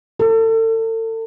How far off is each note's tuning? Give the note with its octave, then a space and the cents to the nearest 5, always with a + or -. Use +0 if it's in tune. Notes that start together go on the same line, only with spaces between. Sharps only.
A4 +35